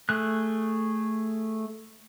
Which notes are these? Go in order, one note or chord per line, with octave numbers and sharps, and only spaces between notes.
A3 G#4 F#6